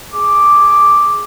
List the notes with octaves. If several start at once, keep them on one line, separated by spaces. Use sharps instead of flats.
G#4 D6